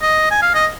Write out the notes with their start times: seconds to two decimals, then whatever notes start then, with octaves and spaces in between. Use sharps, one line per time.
0.02 D#5
0.31 G#5
0.42 F5
0.54 D#5